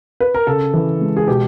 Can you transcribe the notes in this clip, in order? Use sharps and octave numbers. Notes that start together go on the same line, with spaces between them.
B4
A#4
C#3 A4
E3
G#3
G#4
B2 G4